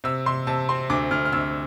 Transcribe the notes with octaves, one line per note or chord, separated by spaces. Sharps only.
C3 E6
C3 C6
C3 A5
C4 C6
D2 D6
D2 F6
F6
D2 E6